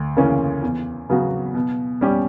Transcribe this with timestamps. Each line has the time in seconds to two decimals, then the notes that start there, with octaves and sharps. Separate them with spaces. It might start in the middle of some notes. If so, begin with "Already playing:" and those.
Already playing: D2
0.17 C#3 E3 A#3 C#4
0.62 E2
1.10 C#3 F#3 B3 F#4
1.55 B2
2.01 G3 C#4 G4